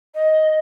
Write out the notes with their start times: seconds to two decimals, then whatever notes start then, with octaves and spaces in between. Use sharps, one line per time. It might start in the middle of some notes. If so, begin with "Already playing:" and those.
0.15 D#5